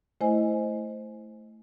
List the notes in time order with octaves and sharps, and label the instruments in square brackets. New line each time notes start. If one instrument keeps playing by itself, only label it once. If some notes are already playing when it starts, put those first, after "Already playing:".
[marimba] A3 E4 C5 D#5 G#5